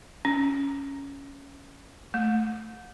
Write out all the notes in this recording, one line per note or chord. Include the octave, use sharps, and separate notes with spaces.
C#4
A3